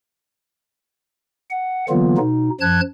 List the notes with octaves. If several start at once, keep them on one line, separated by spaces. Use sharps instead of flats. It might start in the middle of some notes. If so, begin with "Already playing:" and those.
F#5
D3 E3 F#3 A#3 B3 F4
B2 D#4
F#2 F3 A5 F#6 G#6